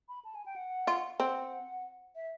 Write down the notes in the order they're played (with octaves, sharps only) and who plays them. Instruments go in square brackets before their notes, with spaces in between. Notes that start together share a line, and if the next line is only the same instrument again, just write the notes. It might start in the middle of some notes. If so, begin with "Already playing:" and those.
[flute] B5
A5
G#5
G5
F#5
[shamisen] F4
[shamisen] C4 [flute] F#5
[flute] E5